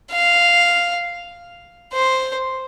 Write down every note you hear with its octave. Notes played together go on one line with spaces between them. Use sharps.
F5
C5